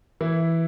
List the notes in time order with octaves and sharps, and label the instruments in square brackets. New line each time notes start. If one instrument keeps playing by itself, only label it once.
[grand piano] E3 E4